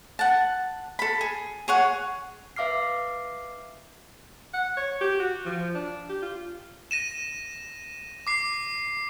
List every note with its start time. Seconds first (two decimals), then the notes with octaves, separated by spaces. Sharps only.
0.19 F#5 A5
0.99 A4 B5
1.21 G#4
1.68 G#4 C#5 F#5
2.56 B4 E5 F5 D6 F6 C7
4.54 F#5
4.77 C#5
5.01 G4
5.19 F#4
5.45 F3
5.74 D4
6.09 G4
6.22 F4
6.91 A#6 D#7 E7
8.27 D6 C7